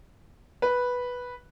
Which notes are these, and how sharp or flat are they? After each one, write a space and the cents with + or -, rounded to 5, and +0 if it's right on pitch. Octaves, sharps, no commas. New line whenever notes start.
B4 -5